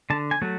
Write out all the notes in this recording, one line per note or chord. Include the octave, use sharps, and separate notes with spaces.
D3 A5
G#5
F#3 A3